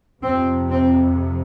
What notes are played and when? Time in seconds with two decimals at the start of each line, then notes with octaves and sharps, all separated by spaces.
0.22 F2 C3 C4
0.71 C4